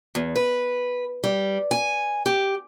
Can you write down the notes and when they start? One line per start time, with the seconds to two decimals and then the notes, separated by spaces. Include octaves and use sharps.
0.15 E2
0.36 B4
1.24 G3
1.71 G#5
2.26 G4